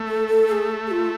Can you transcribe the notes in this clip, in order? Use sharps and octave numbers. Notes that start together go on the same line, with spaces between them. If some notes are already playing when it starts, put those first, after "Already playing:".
Already playing: A3
A4
A4
A4
G#4
G#4
F4